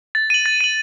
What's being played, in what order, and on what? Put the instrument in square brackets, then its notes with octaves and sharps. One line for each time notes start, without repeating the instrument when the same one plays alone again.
[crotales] A6
D#7 F#7
A6
D#7 F#7